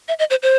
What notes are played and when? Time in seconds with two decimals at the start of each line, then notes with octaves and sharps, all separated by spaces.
0.08 E5
0.19 D#5
0.30 C5
0.42 C5